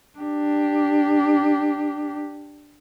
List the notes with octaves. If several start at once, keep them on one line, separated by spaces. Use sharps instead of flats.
D4 G4